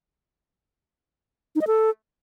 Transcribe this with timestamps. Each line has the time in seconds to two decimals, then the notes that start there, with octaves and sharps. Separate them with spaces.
1.55 D#4
1.61 D#5
1.67 A4